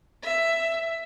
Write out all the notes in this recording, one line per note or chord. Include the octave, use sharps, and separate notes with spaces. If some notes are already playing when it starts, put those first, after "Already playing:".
E5